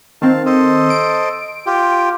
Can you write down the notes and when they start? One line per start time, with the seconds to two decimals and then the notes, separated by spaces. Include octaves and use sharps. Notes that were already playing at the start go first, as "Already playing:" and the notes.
0.22 D#3 C4 F5 A5
0.46 A4 C5 D#5
0.90 D7
1.66 F4 G4